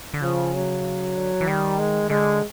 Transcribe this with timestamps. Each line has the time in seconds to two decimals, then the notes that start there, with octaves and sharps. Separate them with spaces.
0.14 D3
0.22 C#3 F3
0.54 F#3
1.16 D3
1.41 E3
1.48 D#3 G3
1.78 G#3
2.10 D3 G#3